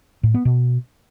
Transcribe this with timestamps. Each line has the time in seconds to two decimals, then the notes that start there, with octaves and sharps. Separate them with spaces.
0.23 A2
0.34 B3
0.45 B2